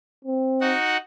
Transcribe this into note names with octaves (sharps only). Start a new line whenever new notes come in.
C4
D#4 F#4 F#5